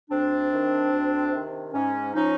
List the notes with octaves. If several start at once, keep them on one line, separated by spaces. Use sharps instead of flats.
D2 C4 D4
C3 D#3
D2
C3 D#3
G#2 C#4
F3 C#4 D#4